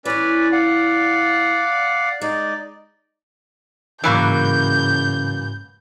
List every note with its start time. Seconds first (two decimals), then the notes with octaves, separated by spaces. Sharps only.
0.05 E2 E3 C#4 B4 D5
0.52 D5 F5 F#5
2.21 G#3 D#4 D5
4.04 G#2 C#3 E3 F#3 A#3 B5 F#6 G6